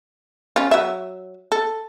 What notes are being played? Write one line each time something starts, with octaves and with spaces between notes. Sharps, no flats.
C#4 F4
F#3 E5
A4